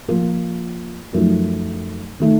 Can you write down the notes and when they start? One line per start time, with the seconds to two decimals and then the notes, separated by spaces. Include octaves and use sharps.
0.08 F3 A#3 F4 A#4
1.13 F#2 F3 A3 D#4 A#4
2.20 D#3 A3 D#4